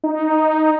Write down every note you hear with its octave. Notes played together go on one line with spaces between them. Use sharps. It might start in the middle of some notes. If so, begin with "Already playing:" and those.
D#4